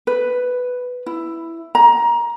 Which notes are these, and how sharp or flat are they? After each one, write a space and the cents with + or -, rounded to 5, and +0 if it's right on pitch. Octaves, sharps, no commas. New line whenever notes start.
B4 +5
E4 +5
A#5 +20